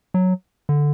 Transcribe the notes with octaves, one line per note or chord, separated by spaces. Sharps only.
F#3
D3